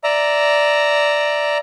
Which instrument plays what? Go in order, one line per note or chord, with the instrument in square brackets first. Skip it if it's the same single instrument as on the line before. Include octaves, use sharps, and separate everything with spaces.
[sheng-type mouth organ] D5 E5 A#5